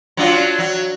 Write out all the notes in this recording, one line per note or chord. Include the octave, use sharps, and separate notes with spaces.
F#3 D4 F4
F#3